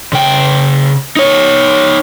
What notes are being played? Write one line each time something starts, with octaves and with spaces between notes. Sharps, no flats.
C#3 G5
D#4 C#5